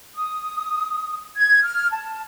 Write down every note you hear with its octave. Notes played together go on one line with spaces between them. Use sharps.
D#6
G#6
F6
A5